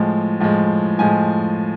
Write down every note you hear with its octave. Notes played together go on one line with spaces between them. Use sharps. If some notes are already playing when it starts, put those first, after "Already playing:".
Already playing: A2 F3 G#3
A2 F3 G#3
A2 F3 G#3 G#5